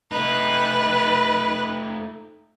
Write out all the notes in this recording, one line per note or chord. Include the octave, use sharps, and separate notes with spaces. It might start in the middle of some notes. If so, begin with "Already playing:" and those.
A3 D#4 B4